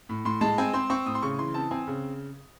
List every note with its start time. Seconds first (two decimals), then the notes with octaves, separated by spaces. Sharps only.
0.09 A2
0.25 A2 C6
0.41 G#3 A5
0.58 C4 G#5
0.73 C4 C6
0.90 C4 C#6
1.06 A2 D#6
1.15 C6
1.22 C#3 C#6
1.39 E3 C6
1.54 C4 A5
1.71 C4 G#5
1.87 C#3